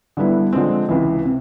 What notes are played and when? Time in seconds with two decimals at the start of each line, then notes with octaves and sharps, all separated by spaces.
0.17 D3 G3 B3 E4
0.53 D3 F3 G#3 C4
0.89 C#2 C3 E3
1.25 C3